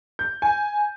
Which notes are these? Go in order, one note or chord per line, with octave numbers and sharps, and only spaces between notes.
G6
G#5